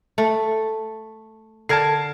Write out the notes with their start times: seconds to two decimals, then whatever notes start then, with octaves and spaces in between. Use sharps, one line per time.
0.18 A3
1.69 D3 A#4 A5 G#6 C7